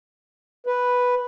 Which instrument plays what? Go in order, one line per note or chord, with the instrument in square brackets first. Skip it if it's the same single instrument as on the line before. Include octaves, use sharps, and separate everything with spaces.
[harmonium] B4